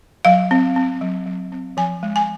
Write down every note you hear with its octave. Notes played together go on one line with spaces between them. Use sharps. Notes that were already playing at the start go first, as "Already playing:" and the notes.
F#3 F5
C4
C4
F#3
F#3
C4
F3 G#5
G#3
G#5